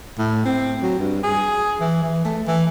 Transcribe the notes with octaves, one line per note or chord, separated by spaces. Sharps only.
A2
C4
F#3
G2
G#4
E3
E3
A3
E3